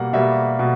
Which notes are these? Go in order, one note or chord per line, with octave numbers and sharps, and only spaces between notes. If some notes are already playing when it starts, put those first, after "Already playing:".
Already playing: B2 G3 A#3 F#5
B2 G3 A#3 E5
B2